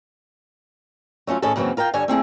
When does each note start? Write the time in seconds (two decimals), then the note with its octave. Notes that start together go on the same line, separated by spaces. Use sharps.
1.27 F#3 A3 C#4 F4
1.42 A2 D#3 C#4 G#4 A4
1.56 F#2 C#3 E3 F#3 A#3 C4
1.77 F4 A#4 F5 G5
1.94 G2 D3 C#5 G#5
2.08 A3 C4 E4 G#4